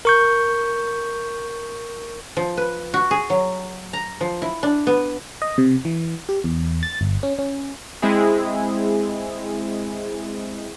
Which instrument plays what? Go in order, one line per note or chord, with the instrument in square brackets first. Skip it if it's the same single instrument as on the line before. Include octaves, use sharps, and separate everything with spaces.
[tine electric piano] A#4 C#6 G6
[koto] F3
B4
F#4
G#4
F#3
A#5
F3
E4
D4
B3
[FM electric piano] D#5
C3
E3
G4
E2
A6
G1
C#4
C#4
[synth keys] G#3 C4 E4 G#4